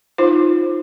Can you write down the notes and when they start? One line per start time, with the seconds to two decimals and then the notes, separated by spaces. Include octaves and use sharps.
0.18 D#4 F4 C5